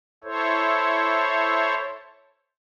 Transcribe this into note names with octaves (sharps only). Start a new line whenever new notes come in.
E4 A4 C5 C#5